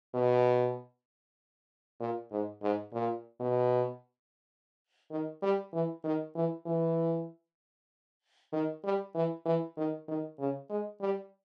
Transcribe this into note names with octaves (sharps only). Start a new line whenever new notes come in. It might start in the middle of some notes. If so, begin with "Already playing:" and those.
B2
A#2
G#2
G#2
A#2
B2
D#3
G3
E3
D#3
E3
E3
D#3
G3
E3
E3
D#3
D#3
C#3
G#3
G3